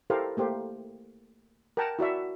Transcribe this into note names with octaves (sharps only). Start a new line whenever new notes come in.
E4 G4 A4 A#4 C5 F5
A3 A#3 G4 C5
A#4 F#5 G5 A5 A#5
E4 F#4 D5 E5